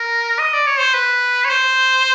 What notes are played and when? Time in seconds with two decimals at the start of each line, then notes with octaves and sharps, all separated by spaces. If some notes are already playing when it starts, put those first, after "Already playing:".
Already playing: A#4
0.39 D#5
0.53 D5
0.67 C#5
0.80 C5
0.94 B4
1.45 C#5
1.50 C5